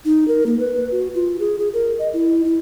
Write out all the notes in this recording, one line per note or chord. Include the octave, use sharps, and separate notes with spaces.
D#4
A#4
A#3
B4
F#4
F4
G#4
G#4
A#4
D#5
E4
E4